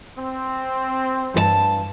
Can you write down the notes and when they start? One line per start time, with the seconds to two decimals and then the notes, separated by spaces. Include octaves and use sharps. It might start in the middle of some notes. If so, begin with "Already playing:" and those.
0.18 C4
1.34 G2 G#4 A5